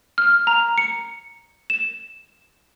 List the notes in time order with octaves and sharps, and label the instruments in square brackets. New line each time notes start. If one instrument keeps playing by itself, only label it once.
[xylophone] F6
A#5
C#7
E7